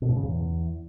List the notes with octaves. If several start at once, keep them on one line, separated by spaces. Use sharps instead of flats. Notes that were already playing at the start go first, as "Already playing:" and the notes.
B2
G#2
C#3
E2